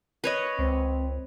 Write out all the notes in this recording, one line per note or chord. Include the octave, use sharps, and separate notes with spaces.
B4 C#5 D#5
C#2 C4